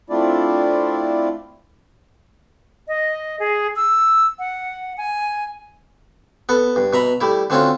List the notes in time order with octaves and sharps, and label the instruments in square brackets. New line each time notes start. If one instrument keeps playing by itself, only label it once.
[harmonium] A3 C4 D4 E4 F4 D5
[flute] D#5
G#4
E6
F#5
G#5
[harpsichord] B3 A4
G2
B2 E5 A#5 B5
G3 A3 E4
D3 A3 C4 C#4 F4 F#4